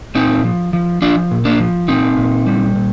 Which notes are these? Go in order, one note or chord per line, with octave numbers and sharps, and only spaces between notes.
A#2 C4 D#4
F3
F3
F3 D4 F4
A#2
A#3 D4
F3
A#2 C4 D#4
A#2
G3
A#2